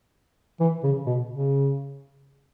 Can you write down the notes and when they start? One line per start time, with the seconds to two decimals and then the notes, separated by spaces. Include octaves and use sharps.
0.60 E3
0.83 C#3
1.06 B2
1.29 C#3